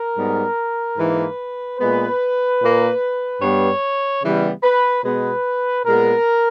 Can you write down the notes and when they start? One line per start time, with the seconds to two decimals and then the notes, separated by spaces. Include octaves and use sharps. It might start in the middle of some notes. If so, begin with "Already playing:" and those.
Already playing: A#4
0.16 G#2 G3 B3
0.98 G#2 E3 A#3 B4
1.79 A#2 G#3 B3 B4
2.60 A#2 A#3
3.41 G2 G3 B3 C#5
4.22 C#3 E3 G3 B3
4.63 B4
5.04 B2 G#3 B3 B4
5.85 A#2 G#3 B3 A#4